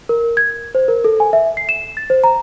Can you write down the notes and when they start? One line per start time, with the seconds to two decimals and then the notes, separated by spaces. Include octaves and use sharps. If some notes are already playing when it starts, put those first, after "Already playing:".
0.09 A#4
0.37 G#6
0.75 C5
0.88 A#4
1.04 A4
1.20 G#5
1.33 E5
1.57 C7
1.69 E7
1.97 A6
2.10 C5
2.24 A#5